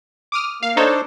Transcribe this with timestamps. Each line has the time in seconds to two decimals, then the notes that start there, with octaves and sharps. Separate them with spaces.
0.32 D6 D#6 F6
0.63 A#3 F5
0.77 D4 D#4 A4 C5 C#5